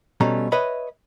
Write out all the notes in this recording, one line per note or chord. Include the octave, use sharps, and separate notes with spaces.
B2 G3 A3 C#4 A#5
B4 C#5 D#5 E5 B5